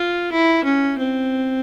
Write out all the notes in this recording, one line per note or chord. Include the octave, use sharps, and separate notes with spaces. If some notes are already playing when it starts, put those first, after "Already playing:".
Already playing: F4
E4
C#4
C4